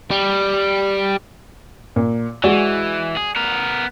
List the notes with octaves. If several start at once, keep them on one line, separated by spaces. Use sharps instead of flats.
G3
A#2
E3 G#3 F#4 D5
G#4
B3 A#4